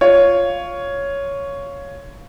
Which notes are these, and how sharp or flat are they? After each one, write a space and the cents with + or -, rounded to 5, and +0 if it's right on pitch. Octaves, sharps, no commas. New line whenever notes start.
F4 +0 C#5 +5